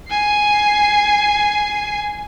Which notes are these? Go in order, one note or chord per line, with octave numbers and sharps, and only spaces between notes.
G#5 C7